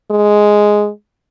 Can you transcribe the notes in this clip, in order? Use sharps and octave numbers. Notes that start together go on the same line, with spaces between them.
G#3